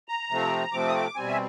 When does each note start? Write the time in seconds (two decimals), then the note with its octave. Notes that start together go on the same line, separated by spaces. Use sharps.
0.08 A#5
0.30 C3 F3 A3 C4
0.72 C3 F3 A3 C4 D6
0.89 D#6
0.94 D6
1.16 B2 G3 C4 G#5
1.28 E5